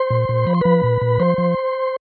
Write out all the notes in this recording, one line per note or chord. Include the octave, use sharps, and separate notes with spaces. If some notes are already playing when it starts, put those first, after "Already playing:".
Already playing: C5 C6
A#2
A#2
F3 B5
C6
F3 B4 B5
A#2
A#2
F3 C5 C6
F3